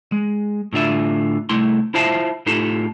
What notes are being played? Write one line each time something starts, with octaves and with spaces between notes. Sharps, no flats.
G#3
A2 D3 F4 E5
C2 A3 E4 C6
E4 F4 C5 E5 F5 A5
A2 D#4 F4 G4 A4